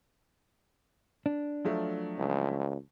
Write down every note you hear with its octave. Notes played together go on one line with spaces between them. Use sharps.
D4
F3 F#3 A3
C#2